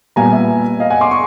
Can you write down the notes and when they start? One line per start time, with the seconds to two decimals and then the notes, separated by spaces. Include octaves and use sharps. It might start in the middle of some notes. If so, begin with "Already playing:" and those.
0.16 A#2 G3 B3 G#5 A#5
0.32 E5
0.80 D#5 F5
0.90 F#5 G#5
1.01 C6 D6
1.11 C#6